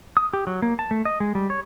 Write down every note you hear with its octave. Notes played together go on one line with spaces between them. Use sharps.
D#6
G4
F#3
A#3
A5
A3
D#5
G#3
G3
C#5